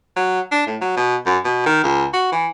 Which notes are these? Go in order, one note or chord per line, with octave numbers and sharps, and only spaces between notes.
F#3
D4
A2
F#3
B2
F#2
B2
D#3
C#2
F#4
E3